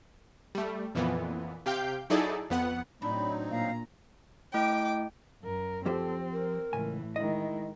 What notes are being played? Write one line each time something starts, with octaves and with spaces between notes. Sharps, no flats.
G3 A3
F2 A#2 E3 B3
C3 G4 F5 G5 G6
F#3 D#4 E4 G#4 A4 D5
F2 B3 F#5
A2 F#3 C4 D4 D#4 B5
A#2 F5 A#5
A3 E4 D#5 G5 D6
F#2 A#4
F3 C4 G4 A4 C5
A#4
C#2 A2 E3 G#5
D#3 G#3 E4 D#5